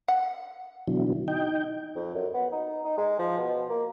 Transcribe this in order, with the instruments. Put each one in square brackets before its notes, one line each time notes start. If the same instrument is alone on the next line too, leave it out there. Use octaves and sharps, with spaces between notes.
[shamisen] F#5
[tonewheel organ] B2 D3 E3 F#3
D#4 G5
[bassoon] F2
F#2
B3
D#4
D#4
G#3
F3
B2
A#3